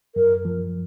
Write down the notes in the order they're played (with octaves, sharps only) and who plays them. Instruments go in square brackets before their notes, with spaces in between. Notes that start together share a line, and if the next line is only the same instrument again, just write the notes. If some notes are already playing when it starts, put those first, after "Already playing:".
[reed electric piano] F#2 [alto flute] A#4
[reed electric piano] F3